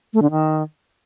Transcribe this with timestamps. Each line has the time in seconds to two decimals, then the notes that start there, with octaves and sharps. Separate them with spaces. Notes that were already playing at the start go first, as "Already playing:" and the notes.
0.13 A3
0.22 D3
0.31 D#3